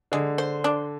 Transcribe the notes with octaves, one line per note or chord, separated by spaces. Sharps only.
D3 G#3
C5
D4